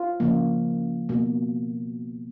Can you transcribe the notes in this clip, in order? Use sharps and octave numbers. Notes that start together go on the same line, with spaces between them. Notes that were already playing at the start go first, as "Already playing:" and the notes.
Already playing: F4
C#3 F3 A#3
B2 A#3